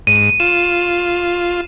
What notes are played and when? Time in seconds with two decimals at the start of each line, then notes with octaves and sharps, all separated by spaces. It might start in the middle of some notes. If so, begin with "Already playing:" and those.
0.07 G#2 D#7
0.40 F4 E7